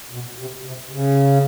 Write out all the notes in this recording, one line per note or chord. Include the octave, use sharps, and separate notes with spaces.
B2
C3
C3
C#3